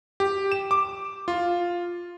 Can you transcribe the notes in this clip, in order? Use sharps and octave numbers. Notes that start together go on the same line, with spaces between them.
G4
E7
D6
F4